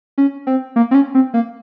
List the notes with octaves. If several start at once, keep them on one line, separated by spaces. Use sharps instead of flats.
C#4
C4
A#3
C4
C#4
C4
A#3